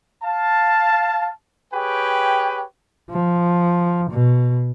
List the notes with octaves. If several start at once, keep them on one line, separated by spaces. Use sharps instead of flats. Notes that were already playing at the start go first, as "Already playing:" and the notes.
F5 A5
G4 G#4 B4 C#5 G5
F3
B2